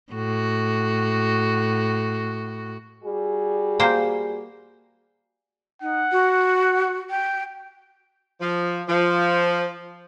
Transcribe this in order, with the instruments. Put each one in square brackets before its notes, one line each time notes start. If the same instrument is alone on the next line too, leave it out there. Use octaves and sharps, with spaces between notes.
[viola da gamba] A2 F#4
[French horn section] G3 F#4 G#4
[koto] A#3 C5 G5
[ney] D#4 [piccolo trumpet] F#5
[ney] F#4
G5
[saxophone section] F3
F3